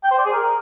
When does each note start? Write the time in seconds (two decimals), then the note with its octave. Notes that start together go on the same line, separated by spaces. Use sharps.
0.04 G5
0.11 C5
0.18 D5
0.25 G#4
0.33 A#4